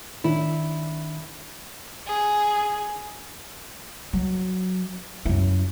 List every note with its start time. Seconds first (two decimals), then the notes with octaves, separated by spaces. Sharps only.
0.24 D#3 D4 E4
2.07 G#4
4.13 F#3
5.25 F#2 E4